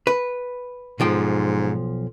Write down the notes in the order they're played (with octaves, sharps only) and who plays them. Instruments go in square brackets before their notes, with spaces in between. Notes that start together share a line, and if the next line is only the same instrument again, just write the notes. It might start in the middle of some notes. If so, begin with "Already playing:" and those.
[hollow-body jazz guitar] B4
[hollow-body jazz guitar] B1 F3 G5 [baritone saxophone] G#2